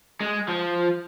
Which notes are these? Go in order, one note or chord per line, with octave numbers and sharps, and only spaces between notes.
G#3
F3